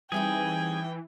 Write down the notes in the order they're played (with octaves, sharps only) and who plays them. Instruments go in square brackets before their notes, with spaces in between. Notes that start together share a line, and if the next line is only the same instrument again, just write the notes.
[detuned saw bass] E3 [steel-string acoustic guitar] G3 C4 D#4 [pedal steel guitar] G#4 [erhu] G5